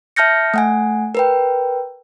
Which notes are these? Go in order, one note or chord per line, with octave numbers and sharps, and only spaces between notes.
E5 A5 F6 G6 A#6 C#7
A3 F#5 G#5
A#4 B4 G5